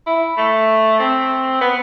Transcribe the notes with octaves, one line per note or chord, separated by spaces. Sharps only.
E4
A3
C4
B3